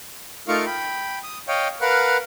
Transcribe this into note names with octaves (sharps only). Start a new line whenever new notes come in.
A3 D#4 F4 A#4 F5 C#6
G5 B5
D#6
C#5 D#5 F5 G5
A#4 B4 F5 F#5